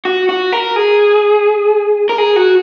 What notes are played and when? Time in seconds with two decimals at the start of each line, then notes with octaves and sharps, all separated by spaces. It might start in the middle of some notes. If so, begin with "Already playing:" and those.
0.05 F#4
0.29 F#4
0.53 A#4
0.76 G#4
2.09 A#4
2.18 G#4
2.36 F#4